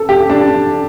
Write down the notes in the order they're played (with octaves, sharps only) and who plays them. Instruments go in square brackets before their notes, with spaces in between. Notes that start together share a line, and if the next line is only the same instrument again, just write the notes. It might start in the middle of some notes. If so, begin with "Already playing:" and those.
Already playing: [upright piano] A4
G4
D4